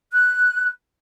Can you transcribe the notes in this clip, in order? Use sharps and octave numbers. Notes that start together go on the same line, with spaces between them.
F#6